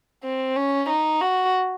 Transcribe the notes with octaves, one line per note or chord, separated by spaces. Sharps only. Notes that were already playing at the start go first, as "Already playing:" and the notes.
C4
C#4
D#4
F#4